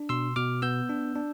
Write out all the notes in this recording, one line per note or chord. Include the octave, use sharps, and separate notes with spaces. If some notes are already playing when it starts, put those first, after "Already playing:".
Already playing: D4
B2 C6 E6
B2 D6 F6
B3 E6 G6
D4
D4